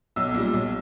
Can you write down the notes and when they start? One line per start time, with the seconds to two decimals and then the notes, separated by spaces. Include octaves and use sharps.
0.16 B1 E6
0.34 A#2 G3
0.53 B1